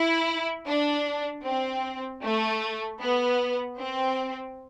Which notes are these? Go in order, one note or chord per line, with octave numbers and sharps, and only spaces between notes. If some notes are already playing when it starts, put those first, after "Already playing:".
Already playing: E4
D4
C4
A3
B3
C4